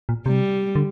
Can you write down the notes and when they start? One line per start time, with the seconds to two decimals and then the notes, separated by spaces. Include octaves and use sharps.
0.09 A#2
0.26 C3 G3
0.75 D3